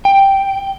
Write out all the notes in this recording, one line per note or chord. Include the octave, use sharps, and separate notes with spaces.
G5